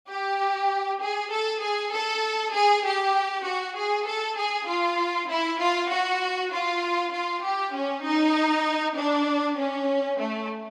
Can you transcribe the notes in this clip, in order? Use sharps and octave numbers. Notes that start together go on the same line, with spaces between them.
G4
G#4
A4
G#4
A4
G#4
G4
F#4
G#4
A4
G#4
F4
E4
F4
F#4
F4
F4
G4
C#4
D#4
D4
C#4
A3